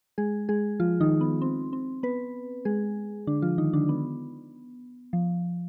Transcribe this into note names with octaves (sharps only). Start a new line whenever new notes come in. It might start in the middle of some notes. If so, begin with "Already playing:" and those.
G#3 G#4
G#3 G#4
F3 F4
D#3 D#4
B3
C4
C4
B3 B4
G#3 G#4
D3 D4
F3 F4
D#3 D#4
D3 D4
B3
F3